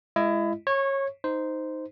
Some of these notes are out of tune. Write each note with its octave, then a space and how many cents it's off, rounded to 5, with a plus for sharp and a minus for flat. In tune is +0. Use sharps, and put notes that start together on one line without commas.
G#3 +0 E4 +25 D#5 +0
C#5 -20 C#6 +0
D#4 +5 C5 -10